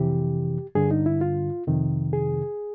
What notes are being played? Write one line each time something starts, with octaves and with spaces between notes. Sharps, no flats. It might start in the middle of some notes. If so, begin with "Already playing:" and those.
Already playing: F2 C3 E3 G4
G2 D3 G#4
D#4
E4
F4
F2 C3 D#3
G#4